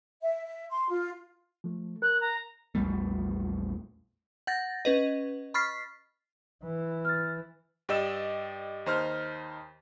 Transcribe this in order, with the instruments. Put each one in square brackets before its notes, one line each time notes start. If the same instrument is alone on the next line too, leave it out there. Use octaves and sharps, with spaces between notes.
[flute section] E5
E5
C6
F4
[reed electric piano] F3 A3
[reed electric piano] A#4 [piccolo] F#6
[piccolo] A#5
[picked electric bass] A#1 E2 G3 A3
[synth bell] F#5 G6 A6 A#6
C#4 B4 D#5
B5 C#6 F6 A6 B6 C7
[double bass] E3
[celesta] F6 A6
[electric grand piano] G2 G4 D5 D#5 E6 E7
D#2 D#4 C5 C6 F6